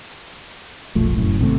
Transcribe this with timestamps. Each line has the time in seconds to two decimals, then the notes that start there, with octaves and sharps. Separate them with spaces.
0.95 E1 A#1 F3 A3
1.15 F1 F#2 A2
1.39 G#1 C3 D#3 A3